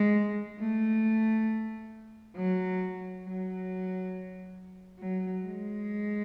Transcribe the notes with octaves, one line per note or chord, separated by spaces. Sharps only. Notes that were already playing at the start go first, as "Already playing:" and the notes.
Already playing: G#3
A3
F#3
F#3
F#3
G#3